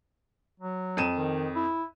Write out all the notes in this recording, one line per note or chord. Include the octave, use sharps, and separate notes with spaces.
F#3
F2 D#7 E7
D#3
E4